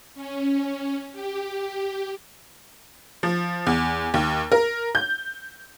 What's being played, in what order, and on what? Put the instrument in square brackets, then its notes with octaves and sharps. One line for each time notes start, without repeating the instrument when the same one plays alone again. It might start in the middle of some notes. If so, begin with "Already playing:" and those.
[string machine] C#4
G4
[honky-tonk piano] F3
E2
D#2
A#4
G6